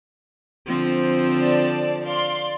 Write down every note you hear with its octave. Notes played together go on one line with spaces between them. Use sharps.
D3 F3 C4
D5 A5
D5 F5 C6